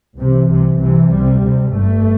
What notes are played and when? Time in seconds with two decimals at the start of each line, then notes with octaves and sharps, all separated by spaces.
0.18 C2 C3 E3
0.50 C2 C3
0.79 C2 C3 E3
1.10 C2 C3 G3
1.41 D2 C3
1.72 G1 G2 A3